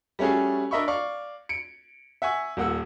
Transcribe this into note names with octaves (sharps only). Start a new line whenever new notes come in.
G3 A3 C#4 F#4 G#4
D4 A#4 D#5 E5 B5 C#6
D5 F5 C#6
C#7 D7
E5 F#5 G#5 C#6
D#1 A#3 F#5 E6